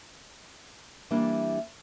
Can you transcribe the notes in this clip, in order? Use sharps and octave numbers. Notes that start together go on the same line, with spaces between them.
E3 G3 A#3 D4